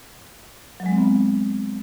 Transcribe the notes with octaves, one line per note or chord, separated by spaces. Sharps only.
F#3
G#3
C4
B3